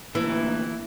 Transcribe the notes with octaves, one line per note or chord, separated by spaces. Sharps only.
D2 A#2 E3